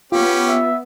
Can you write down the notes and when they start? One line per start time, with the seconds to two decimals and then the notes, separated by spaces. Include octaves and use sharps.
0.12 B3 C#4 F4 G4
0.48 E5